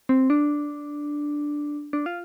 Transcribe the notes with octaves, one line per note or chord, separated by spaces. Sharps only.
C4
D4
D4
F4